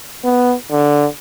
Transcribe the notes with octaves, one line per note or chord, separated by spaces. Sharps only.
B3
D3